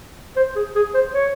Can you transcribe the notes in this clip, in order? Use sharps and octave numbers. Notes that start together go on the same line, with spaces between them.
C5
G#4
G#4
C5
C#5